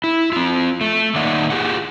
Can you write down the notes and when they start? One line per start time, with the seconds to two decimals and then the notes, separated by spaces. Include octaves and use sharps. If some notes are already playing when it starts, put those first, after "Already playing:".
0.04 E4
0.33 C4 F4
0.81 A3
1.15 D#3 A#3 D#4 D5 E5 F#5
1.50 F4 G4 G#4 F#5